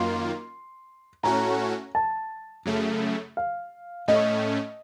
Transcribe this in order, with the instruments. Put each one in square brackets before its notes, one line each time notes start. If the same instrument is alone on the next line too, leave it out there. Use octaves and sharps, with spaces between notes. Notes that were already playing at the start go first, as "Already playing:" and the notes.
Already playing: [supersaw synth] F#2 D#3 A#3 F4 [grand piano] C6
[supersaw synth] A2 A3 C#4 F#4 [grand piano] A#5
[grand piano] A5
[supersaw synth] F#2 C#3 A3
[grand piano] F5
[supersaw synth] A2 A3 C#4 [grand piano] D#5